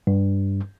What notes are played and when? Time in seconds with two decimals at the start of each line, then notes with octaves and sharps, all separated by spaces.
0.07 G2